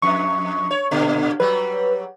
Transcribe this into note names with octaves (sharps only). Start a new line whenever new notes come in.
F2 C#6
C#5
A#2 D3
F#3 G3 B4